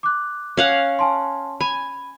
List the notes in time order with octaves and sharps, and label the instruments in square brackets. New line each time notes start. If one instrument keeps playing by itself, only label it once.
[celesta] D6 F#6
[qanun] C#4 F5 F#5
[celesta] G#5 A5 C6
[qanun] G#5 [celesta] B5